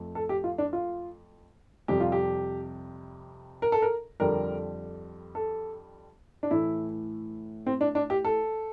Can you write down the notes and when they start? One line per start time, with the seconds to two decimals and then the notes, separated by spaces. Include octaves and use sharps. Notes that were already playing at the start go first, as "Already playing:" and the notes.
Already playing: F2 A3
0.15 A4
0.29 G4
0.44 F4
0.58 D4
0.73 F4
1.88 F2 C3 G3 G4
2.00 F4
2.12 G4
3.62 A#4
3.72 A4
3.82 A#4
4.20 F2 D3 G3 A#4
5.35 A4
6.43 D4
6.51 A2 E3 A3 E4
7.66 C4
7.81 D4
7.95 D4
8.10 G4
8.25 A4